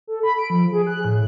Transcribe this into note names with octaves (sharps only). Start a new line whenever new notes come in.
A4
B5
D7
F3
G#4
F#6
A2